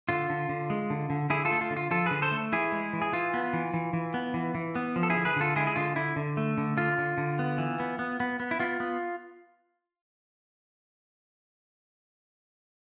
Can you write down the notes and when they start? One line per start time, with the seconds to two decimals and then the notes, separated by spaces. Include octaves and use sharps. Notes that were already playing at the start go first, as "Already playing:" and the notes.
0.09 D3 F4
0.30 D3
0.49 D3
0.70 G#3
0.90 D3
1.10 D3
1.30 D3 E4 G#4
1.45 F4 A4
1.51 A3
1.61 F4
1.70 D3
1.77 F4
1.91 F3 F4 A4
2.06 D3 G#4 B4
2.22 A4 C5
2.31 A3
2.52 E3 E4 G#4
2.72 G#3
2.93 E3
3.02 G#4
3.13 E3 F4
3.34 B3
3.53 E3
3.74 E3
3.93 E3
4.14 B3
4.34 E3
4.55 E3
4.75 B3
4.96 F3
5.03 A4
5.10 E4 G#4
5.16 D3
5.25 G#4 B4
5.36 D3 F4 A4
5.55 G#3 E4 G#4
5.67 G#4
5.76 D3 F4
5.96 D3 E4
6.16 D3
6.37 A3
6.58 D3
6.77 D3 F4
6.98 D3
7.18 D3
7.39 B3
7.58 E3
7.80 B3
7.99 B3
8.20 B3
8.40 B3
8.51 E4
8.60 B3 F4
8.80 B3